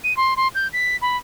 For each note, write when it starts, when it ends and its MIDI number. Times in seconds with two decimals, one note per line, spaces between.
0.04 0.16 99
0.17 0.34 84
0.37 0.48 84
0.55 0.68 91
0.73 0.97 95
1.02 1.17 83